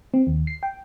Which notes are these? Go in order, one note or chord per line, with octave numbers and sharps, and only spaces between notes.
C4
D#2
C7
G5